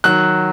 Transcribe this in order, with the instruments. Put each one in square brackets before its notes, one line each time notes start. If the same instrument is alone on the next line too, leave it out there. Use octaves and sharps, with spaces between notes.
[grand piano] D#3 F#3 F#6